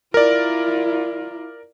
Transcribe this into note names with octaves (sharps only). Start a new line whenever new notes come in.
E4 F4 A#4 D5